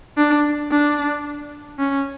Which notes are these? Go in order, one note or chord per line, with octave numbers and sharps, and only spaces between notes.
D4
D4
C#4